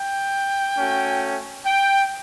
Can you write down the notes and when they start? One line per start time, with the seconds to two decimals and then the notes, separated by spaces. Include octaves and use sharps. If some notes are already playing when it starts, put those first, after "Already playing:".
Already playing: G5
0.77 A3 C#4 F#4
1.65 G5